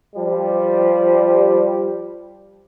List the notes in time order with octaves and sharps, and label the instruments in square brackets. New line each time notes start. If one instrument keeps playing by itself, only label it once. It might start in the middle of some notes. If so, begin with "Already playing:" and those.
[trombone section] F3 G3